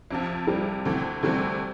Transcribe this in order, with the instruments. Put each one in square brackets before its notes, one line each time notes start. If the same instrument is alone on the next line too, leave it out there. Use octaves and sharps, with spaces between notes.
[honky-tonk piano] F2 C3 F3
[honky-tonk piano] F2 C3 F3 [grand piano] G3
[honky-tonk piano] D2 C3 E3 A3 C4
[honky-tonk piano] D2 C3 E3 A3 C4 [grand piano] G3